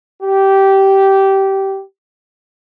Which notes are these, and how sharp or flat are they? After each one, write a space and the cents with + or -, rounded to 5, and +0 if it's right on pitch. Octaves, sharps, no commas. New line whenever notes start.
G4 -15